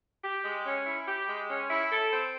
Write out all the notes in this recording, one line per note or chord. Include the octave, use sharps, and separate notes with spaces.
G4
G#3
C#4
E4
G4
G#3
C#4
E4
A4
C4